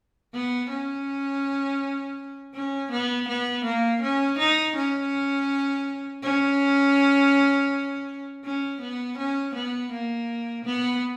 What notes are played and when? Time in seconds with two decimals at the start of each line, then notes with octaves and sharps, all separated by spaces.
0.33 B3
0.69 C#4
2.54 C#4
2.91 B3
3.28 B3
3.64 A#3
4.01 C#4
4.38 D#4
4.76 C#4
6.22 C#4
8.44 C#4
8.81 B3
9.18 C#4
9.54 B3
9.92 A#3
10.65 B3